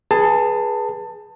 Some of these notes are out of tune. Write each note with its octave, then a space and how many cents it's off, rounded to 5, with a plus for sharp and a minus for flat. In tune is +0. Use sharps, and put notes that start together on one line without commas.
G#4 +0 B4 -25 A5 +20